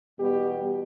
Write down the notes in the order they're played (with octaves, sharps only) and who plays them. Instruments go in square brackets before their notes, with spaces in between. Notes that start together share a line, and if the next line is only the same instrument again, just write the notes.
[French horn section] E2 B2 G3 B3 G4